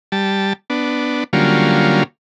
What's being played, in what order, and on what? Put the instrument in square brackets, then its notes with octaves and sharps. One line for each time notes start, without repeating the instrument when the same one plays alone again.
[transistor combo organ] G3 A5
B3 D4
D3 F#3 G3 A#3 C#4 F4